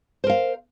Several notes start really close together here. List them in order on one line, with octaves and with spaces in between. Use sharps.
C5 A#4 F5